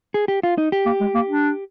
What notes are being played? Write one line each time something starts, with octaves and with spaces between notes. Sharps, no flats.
G#4
G4
F4
D#4
G4
A#3
G#3
A#3
D4